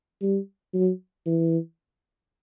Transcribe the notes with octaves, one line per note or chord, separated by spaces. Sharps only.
G3
F#3
E3